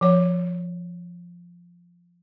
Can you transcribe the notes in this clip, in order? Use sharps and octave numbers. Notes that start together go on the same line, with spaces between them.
F3 C#5